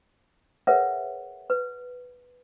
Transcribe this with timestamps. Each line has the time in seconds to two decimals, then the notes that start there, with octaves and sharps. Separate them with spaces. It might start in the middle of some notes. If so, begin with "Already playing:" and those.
0.67 G#4 A#4 B4 C#5 E5 F#5
1.50 B4